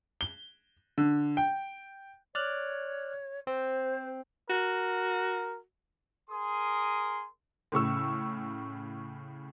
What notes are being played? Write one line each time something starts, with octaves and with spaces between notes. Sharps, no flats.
G7
D3
G5
C#5 D5 F6 F#6
C4 C5
F#4 A#4
G#4 A#4 C6 D#6
A2 C#3 C#6 E6